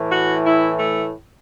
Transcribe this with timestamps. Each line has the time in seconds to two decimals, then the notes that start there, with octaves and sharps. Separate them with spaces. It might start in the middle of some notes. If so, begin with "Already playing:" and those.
Already playing: A2 E3
0.10 F#4
0.44 E4
0.79 A3